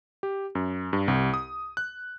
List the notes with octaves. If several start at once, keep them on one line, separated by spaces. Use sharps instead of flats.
G4
F#2
G2
C2
D#6
F#6